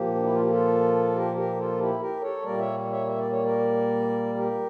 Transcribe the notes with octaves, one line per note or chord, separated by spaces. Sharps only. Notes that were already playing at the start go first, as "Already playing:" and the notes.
Already playing: A#2 F3 A#3 G4
D4
E4
F4
G4
F4 A4
G4 A#4
G4 A#4
F4 A4
E4 G4
G4 A#4
A4 C#5
A#2 G3 A#3 A#4 D5
C#5 E5
C#5 E5
E5
D5
C#5
A#4 D5
G4 A#4